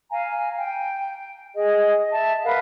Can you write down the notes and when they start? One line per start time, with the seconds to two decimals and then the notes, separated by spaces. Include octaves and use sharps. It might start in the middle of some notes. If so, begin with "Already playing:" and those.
0.10 F5 G#5 A#5
0.56 G5
1.55 G#4 D#5
2.11 E5 A5
2.43 A#4 B4 F5 F#5